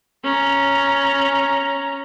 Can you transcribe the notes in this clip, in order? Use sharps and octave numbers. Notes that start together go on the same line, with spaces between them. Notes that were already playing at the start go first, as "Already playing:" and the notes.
C#4 A#5